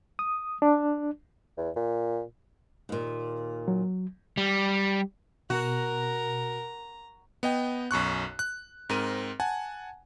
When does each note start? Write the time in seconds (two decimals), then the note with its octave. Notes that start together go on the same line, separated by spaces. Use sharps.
0.19 D#6
0.62 D4
1.58 E2
1.76 A#2
2.89 D#2 A#2
3.68 F#3
4.37 G3
5.50 B2 F#4 A#4 A#5
7.43 B3 D#5 G5
7.91 B1 F#2 C#6 F#6
8.39 F#6
8.89 G#2 C4 A#4 D#7
9.40 F#5 G#5 A5